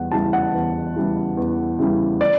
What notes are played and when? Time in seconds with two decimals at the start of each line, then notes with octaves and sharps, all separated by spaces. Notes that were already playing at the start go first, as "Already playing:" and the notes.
Already playing: E2 G3 F#5
0.12 C#3 E3 G3 A5
0.33 F#5
0.54 E2
0.96 C#3 E3 G3
1.37 E2
1.79 C#3 E3 G3
2.21 D5